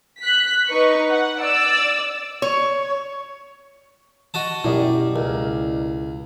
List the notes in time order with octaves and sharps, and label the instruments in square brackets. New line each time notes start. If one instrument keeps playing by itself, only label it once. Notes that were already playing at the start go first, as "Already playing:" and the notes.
[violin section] F#6 B6
D#4 B4 C#6
F#5
D5 E6
[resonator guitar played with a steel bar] C#5
[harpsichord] F#4 D#5 A5
[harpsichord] F#2 [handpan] B2 G4 [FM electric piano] E4 D5 D#5
[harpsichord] C#2 [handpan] A#4